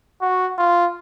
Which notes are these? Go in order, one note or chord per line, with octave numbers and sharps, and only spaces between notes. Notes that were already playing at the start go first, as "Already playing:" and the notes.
F#4
F4